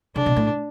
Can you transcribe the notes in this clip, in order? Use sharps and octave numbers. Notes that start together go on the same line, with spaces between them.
C#3 D4
B2
A2